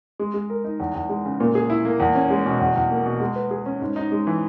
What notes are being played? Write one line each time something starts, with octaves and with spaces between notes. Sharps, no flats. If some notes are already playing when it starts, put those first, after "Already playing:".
G#3
G#3
A#4
D#4
E2
E2
G#3
C#3
A#2
G#4
E4
A#3
E2
C#4
G#3
B2
E2
E2
A#3
B2
G#3
B4
G#4
C#4
G#2
D#4
G#3
E3